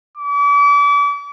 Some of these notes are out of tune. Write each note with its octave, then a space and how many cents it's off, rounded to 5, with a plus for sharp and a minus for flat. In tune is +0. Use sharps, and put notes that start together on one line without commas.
D6 -40